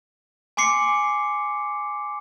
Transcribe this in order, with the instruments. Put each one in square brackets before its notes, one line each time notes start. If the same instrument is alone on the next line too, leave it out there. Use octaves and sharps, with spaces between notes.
[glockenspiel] G#5 C6 D6 C7 C#7